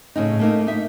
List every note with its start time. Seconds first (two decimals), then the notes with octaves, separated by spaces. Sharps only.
0.16 A2 C#3 D#4
0.39 A3 A#3 D#4
0.67 D#4 E5